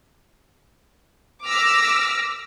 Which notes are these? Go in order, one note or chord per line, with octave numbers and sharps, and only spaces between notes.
D6 E6 F6 A#6 B6